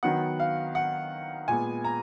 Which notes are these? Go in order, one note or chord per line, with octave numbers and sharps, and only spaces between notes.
D#3 F#3 B3 F#5
F5
F#5
A#2 G#3 B3 G#5
A#5